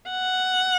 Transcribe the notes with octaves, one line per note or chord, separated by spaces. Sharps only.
F#5